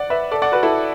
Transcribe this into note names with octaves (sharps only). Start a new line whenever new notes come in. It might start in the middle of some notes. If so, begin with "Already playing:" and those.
Already playing: D5 F#5
B4 E5
A4 D5
D5 F#5
F#4 B4
E4 A4